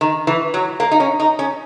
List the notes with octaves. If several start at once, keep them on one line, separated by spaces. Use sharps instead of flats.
D#3
E3
F#3
A#3
D#4
C#4
D#4
C#4